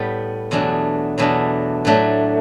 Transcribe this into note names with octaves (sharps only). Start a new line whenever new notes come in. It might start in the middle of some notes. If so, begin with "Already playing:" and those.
Already playing: A2 G3 B3
E2 B2 F#3 A3 D4
E2 B2 F#3 A3 D4
A2 F#3 A3 D4